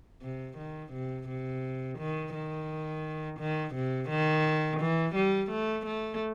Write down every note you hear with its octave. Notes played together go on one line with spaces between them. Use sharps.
C3
D#3
C3
C3
D#3
D#3
D#3
C3
D#3
E3
G3
A3
A3